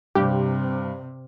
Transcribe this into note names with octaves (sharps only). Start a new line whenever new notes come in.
G2 C3 G4